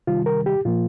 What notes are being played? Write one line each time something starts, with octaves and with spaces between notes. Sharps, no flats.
C3 D#3 G3 F4
A#4
G4
A#2 F3 A#3 F4